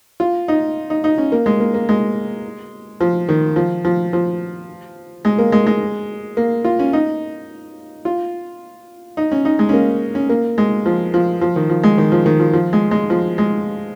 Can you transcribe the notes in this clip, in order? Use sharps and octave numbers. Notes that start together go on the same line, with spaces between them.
F4
D#4
D#4
D#4
C#4
A#3
G#3
A#3
A#3
G#3
F3
D#3
F3
F3
F3
G#3
A#3
G#3
G#3
A#3
F4
C#4
D#4
F4
D#4
C#4
D#4
G#3
C#4
A#3
C#4
A#3
G#3
F3
F3
F3
D#3
F3
G#3
D#3
F3
D#3
F3
F3
G#3
G#3
F3
G#3